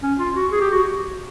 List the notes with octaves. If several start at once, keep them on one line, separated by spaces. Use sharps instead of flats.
C#4
F4
F#4
G#4
G4
F#4